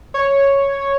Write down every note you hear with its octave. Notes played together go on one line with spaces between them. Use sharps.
C#5